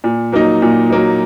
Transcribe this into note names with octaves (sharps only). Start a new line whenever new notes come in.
A#2
F#3 A#3 D#4
A#2
F#3 A#3 D#4